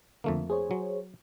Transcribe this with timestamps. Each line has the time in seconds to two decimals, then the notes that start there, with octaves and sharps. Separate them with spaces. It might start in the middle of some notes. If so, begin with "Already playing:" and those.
0.24 F2 D3 A3 A#3
0.50 G#4 C5 C#5
0.71 F#3